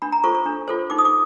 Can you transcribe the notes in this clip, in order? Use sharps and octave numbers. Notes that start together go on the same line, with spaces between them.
D4 B5
A#5
F4 A4 C5 C#6
C#6
D4
F4 A4 C5
D#4 D6
D#6
D6